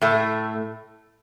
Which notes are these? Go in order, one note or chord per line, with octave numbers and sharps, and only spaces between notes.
A2 A3